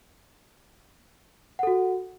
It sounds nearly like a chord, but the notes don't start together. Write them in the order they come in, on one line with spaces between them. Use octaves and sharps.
F#5 A4 F#4